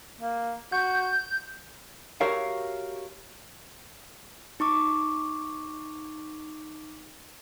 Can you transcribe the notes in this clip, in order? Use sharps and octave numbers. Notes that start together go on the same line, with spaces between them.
A#3
F#4 G6
F#4 G4 A#4 C#5 E5 F5
D#4 C#6 D6